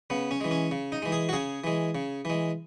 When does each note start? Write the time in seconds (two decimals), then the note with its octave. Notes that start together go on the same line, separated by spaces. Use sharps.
0.10 C#3 B3
0.31 C#4
0.41 E3 G#3
0.51 C#4
0.71 C#3
0.92 D#4
1.02 E3 G#3
1.12 G#4
1.29 F#4
1.33 C#3 G#4
1.64 E3 G#3
1.95 C#3
2.25 E3 G#3